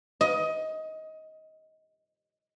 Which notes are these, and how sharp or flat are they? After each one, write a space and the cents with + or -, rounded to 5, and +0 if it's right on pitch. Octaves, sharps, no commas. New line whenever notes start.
D#5 +20